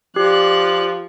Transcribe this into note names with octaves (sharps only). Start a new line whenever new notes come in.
F3 G4 D5 F#6